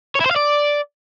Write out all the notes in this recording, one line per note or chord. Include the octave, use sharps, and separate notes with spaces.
C#5
E4
C5
F5
D5